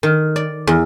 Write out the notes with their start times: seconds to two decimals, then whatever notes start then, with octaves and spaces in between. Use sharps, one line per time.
0.03 D#3
0.36 D5
0.67 E2